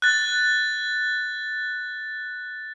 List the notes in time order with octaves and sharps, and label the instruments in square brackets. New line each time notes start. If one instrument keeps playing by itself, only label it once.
[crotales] F#6 A6